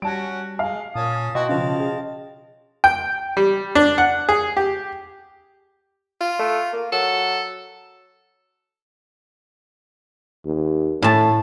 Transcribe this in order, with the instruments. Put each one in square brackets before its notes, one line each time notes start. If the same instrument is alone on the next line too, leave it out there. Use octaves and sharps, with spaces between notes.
[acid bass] G3 [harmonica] C#4 F#4 [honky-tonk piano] A5 D7
[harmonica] G#3 [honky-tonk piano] F5 G#5
[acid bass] A#2 [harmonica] C#4 A5 D#6
[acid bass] B2 [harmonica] E4 F#4 C#6 [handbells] D#5 G5 C6
[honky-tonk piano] C#3 F3 [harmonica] F5 A5
[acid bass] G#4
[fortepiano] G5
G3
D4
F#5
G#4
G4
[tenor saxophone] F4
[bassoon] A3
A#3
[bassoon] F#3 [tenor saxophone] A4
[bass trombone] D#2
[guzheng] A2 A5 [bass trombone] A3